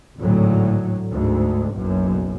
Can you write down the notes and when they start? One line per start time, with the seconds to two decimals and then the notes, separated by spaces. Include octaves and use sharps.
0.17 G#1 D2 A2 F#3
1.11 D2 G#2
1.73 F#1 B1 F#2